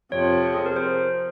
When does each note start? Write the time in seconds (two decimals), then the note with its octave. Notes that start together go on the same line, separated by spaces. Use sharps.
0.12 F2 C3 F3 C#5
0.55 G#4
0.66 A#4
0.76 C5